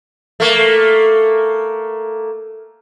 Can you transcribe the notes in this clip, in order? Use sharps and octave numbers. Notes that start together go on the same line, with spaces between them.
A3 A#3